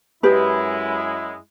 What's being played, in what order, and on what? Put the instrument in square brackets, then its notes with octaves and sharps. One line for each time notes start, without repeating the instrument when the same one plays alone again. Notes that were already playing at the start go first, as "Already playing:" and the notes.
[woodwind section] F#2 G#3 E4 [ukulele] G4 B4